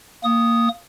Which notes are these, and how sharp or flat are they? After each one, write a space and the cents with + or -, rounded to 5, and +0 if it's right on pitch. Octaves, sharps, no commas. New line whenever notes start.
A#3 -10 D#6 +0